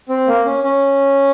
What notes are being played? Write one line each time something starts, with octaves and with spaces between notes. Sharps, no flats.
C4
A#3
C#4
C#4